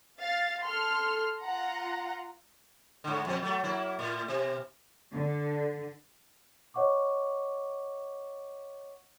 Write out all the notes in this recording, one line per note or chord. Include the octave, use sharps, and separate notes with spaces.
F5 A6
A4 C6 F6
F4 F#5 A#5
G#2 D3
F2 B2 C4
F#3 A3
F#3 A#3 E4
A2
B2
D3
C#5 D#5 F#5 C#6 D6